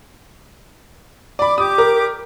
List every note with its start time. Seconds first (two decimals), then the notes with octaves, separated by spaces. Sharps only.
1.39 D5 B5 D6
1.58 G4 D6 D#6
1.78 A#4